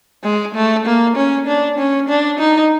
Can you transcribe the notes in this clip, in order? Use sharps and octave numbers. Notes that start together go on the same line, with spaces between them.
G#3
A3
A#3
C#4
D4
C#4
D4
D#4